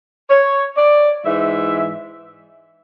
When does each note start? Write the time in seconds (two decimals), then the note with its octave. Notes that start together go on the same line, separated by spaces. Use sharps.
0.30 C#5
0.76 D5
1.24 G#2 E3 E5